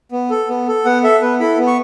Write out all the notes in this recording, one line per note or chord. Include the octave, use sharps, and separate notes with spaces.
B3
A4
B3
A4
B3 F#5
A4 E5
B3 B4
E4 A4 B5
B3
C#6